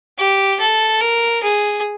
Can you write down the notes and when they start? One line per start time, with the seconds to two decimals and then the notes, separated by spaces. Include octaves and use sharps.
0.18 G4
0.60 A4
1.01 A#4
1.43 G#4